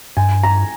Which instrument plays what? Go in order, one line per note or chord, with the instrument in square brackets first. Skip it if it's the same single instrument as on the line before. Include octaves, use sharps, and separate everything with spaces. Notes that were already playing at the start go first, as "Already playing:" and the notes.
[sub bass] G2 [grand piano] G#5
[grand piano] A#5